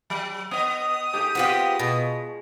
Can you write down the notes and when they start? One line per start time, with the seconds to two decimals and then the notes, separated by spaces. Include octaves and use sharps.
0.10 F#3
0.51 B3 D#5 D#6
1.14 G#2 A3 G4
1.35 G#3 B3 C4 F4 G4
1.80 B2